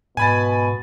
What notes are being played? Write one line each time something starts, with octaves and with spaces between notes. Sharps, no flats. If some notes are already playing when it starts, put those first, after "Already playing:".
G#2 B2 G#5 B5 A6